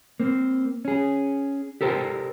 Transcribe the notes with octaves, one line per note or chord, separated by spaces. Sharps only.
A#3 C4
C#4 G#4
G4 A4 A#4 C5 G5